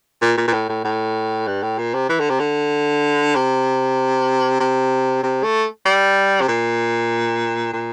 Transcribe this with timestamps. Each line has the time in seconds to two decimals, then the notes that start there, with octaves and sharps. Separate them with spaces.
0.22 A#2
0.37 A#2
0.47 A#2
0.53 A2
0.69 A2
0.85 A2
1.47 G2
1.63 A2
1.78 A#2
1.94 C3
2.09 E3
2.20 D3
2.30 C3
2.40 D3
3.35 C3
4.60 C3
5.23 C3
5.43 A3
5.85 G3
6.41 C3
6.48 A#2
7.73 A#2